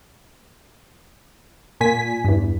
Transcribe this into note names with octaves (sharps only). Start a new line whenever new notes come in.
A#2 G#5 B6
E2 G2